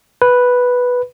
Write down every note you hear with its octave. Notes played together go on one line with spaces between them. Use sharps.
B4